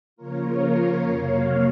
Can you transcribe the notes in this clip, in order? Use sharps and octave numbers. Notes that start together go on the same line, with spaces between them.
C#3 F3 A#3 F4 A#4 C#5
F2 C3 F#3 A#3 C#5 F5